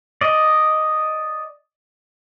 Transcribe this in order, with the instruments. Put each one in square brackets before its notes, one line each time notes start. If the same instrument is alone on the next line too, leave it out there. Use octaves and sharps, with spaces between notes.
[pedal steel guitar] D5 D#5